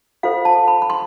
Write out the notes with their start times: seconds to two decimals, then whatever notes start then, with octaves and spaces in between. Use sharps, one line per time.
0.23 F4 A4 C5 F5
0.45 A5
0.68 B5
0.82 B5
0.90 C6